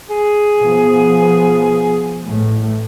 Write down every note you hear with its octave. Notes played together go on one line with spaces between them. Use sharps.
G#4
B2 F3 B3
A1 A2 A3